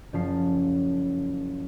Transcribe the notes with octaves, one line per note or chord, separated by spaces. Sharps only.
F#1 F3 C#4 A5 C7